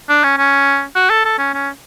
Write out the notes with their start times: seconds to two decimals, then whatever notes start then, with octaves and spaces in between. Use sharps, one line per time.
0.09 D4
0.24 C#4
0.38 C#4
0.95 F#4
1.10 A4
1.25 A4
1.38 C#4
1.54 C#4